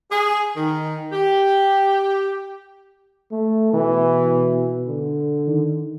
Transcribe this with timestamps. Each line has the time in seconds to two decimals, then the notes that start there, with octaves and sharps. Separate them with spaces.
0.10 G#4
0.57 D#3
1.12 G4
3.32 A3
3.73 B2 E3
4.88 D3
5.47 D#3